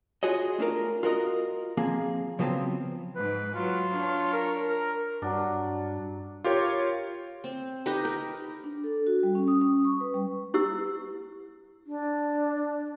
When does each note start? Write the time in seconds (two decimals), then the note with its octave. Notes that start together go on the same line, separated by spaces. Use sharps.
0.23 F4 F#4 G#4 C#5 D#5
0.58 A3 D4 F4 A#4
1.03 F4 F#4 A#4 D#5
1.77 F3 A#3 C4 G#4
2.39 C#3 F3 F#3 B3 C4
3.16 G#2 B4
3.54 F#3 F4
3.91 D4 C#5
4.33 A#4
4.68 A#4
5.22 G2 F#3 D4
6.44 F4 G4 A#4 C#5
7.44 C4
7.86 D#4 G4 B4 D#5
8.05 A#4
8.64 D4
8.84 A4
9.07 F#4
9.23 G3
9.35 C#4
9.48 D#6
9.61 C#4
9.85 C#6
10.01 B4
10.14 G3
10.54 E4 G4 E6
11.87 D4